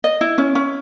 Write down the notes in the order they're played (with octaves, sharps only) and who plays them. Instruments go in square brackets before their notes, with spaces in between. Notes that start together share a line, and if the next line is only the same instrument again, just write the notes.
[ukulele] D#5
E4
C#4
C#4